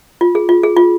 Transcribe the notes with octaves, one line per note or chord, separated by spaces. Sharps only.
F4
G#4
F4
G#4
F4